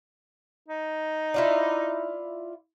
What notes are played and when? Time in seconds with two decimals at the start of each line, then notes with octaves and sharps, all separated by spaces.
0.69 D#4
1.34 E4 F4 D5